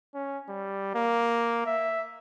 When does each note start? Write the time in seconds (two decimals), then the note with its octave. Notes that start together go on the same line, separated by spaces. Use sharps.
0.14 C#4
0.49 G3
0.95 A#3
1.67 E5